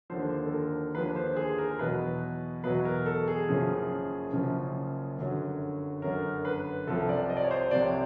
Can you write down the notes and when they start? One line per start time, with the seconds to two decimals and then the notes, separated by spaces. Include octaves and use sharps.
0.10 D#2 D3 F3 C5
0.46 A4
0.52 A#4
0.94 D#2 D3 F3 B4
1.16 C5
1.36 G#4
1.58 A#4
1.79 E2 B2 F#3 B4
2.64 E2 B2 F#3 B4
2.85 A#4
3.06 A4
3.28 G#4
3.49 F#1 F#2 C#3 F3
4.33 F#1 F#2 C#3 F3
5.18 G1 F#2 D3 F#3
6.02 G1 F#2 D3 F#3 A#4
6.45 B4
6.87 C2 C3 F3 A4
7.09 D5
7.30 D#5
7.37 D5
7.44 C#5
7.51 C5
7.71 C2 C3 F3 D5
7.82 C#5